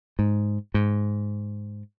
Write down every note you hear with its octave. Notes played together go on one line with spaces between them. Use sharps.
G#2
G#2